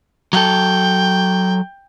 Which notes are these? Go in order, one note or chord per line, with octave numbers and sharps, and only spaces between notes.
F#3 A4 G5